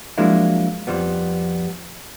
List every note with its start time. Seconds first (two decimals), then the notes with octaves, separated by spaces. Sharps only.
0.18 F3 F#3 G#3 A#3 D4 E4
0.87 F2 F3 G3 B3